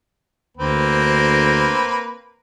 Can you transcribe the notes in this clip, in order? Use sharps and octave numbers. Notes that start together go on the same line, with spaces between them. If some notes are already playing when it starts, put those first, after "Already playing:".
D2 A#3 C4 B4